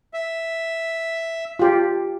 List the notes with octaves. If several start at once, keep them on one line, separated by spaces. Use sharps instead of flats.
E5
F4 G4